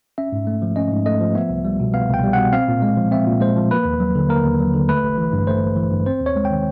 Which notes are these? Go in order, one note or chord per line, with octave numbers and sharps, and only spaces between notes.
C#4 E5
G#2
A3
F3
C#4 D#5
G#2
A3 D#5
F3
B3 E5
C2
G3
B2
B3 F5
C2 G5
G3
B2 F#5
C4 F5
A#2
G#3
F3
C4 E5
A#2
G#3 C5
F3
A#3 B4
D#2
F#3
D3
A#3 A#4
D#2
F#3
D3
A3 B4
A1
E3
G2
A3 C5
A1
E3
G2
C4 C5
D#2
C#5
G#3
G5
D#3